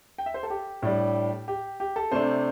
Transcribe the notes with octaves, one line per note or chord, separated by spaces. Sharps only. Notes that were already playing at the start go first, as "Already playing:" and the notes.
G5
E5
C5
A4
G4
A2 G3 D4
G4
G4
A4
C3 A3 D4 C5